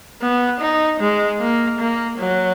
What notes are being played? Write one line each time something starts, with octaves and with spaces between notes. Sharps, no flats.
B3
D#4
G#3
A#3
A#3
F#3